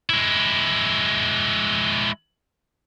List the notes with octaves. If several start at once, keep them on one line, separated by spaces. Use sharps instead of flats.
G#3 E4